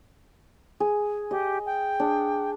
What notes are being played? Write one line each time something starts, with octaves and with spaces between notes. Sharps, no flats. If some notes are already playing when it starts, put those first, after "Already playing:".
G#4
G4 D#5
G5
D4 G#4